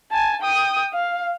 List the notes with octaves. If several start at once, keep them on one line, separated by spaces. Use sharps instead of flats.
G#5 A5
G5 D#6
F5